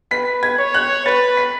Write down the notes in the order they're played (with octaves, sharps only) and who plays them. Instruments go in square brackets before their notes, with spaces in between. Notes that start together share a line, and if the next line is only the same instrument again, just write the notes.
[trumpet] B4 [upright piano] B6
[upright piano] G#6
[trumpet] C#5
[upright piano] F#6
[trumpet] B4 [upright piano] A6
[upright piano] B6